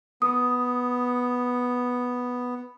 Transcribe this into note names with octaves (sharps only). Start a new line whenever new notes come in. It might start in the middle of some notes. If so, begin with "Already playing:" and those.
B3 D#6